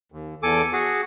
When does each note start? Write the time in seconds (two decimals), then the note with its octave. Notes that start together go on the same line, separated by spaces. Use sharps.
0.12 D#2
0.43 E2 A4 G#5 D6
0.73 F#4 G#4